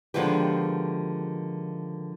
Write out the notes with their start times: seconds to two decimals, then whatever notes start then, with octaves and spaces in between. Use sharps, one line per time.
0.14 D3 D#3 F3 G#3 B3 G4